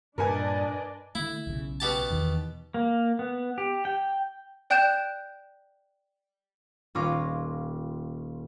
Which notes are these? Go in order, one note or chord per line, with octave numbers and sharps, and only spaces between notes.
G2 A#2 D4 A#4 B4 D5 D#5 G#5
D3 A3 E4
B1 C#3
B2 G4 A5
E2 D#3
A#3
B3
G4
G5
D5 G5 F#6 G6 D7 E7
D#1 C#4 F4 D6 A#6